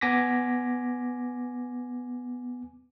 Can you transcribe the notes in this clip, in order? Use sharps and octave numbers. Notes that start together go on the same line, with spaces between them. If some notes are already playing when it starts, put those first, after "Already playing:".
B3 G#5 D6 A#6 B6